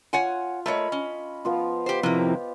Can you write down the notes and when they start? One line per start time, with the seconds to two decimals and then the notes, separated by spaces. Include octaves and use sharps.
0.13 F4 C#5 F#5 G#5
0.66 A3 A#3 C#5 D#5 B5
0.92 C#4
1.45 F3 B3 F4
1.86 G4 C5
2.03 C3 F3 A#3 C4 E4 G4